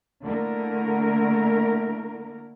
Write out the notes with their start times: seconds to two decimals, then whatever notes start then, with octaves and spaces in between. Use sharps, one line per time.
0.23 D3 A3 A#3 E4 A#4